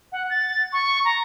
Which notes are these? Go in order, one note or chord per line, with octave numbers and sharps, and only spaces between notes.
F#5
A6
C#6
A#5